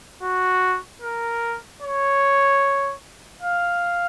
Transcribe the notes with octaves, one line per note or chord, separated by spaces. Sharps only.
F#4
A#4
C#5
F5